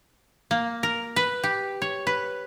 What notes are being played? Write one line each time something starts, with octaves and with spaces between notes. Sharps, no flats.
A#3
A#4
B4
G4
C#5
B4